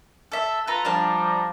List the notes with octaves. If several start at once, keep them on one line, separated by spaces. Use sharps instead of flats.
A4 E5
F4 A4 B4 A#5
F3 G3 D4 F5 A5